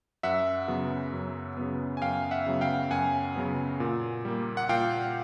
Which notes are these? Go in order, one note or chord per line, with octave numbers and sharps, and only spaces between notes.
F#2 E5 F#5
C#3 F#3 B3
F#2
C#3 F#3 B3
G#5
F#2 F5 G5
E5 F#5
C#3 F#3 B3
F5 G5
F#2 F#5 G#5
C#3 F#3 B3
A#2
G3 A#3
F#5
A#2 F5 G5